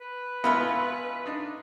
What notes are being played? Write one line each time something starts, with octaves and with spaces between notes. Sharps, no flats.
B4
G#1 B2 B3 E4 F4 B5
D4 D#4